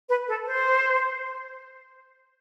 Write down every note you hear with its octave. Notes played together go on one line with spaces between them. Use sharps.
B4
A4
C5